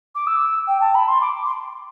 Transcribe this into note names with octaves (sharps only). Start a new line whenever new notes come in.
D6
E6
G5
A5
B5
C6
D6
C6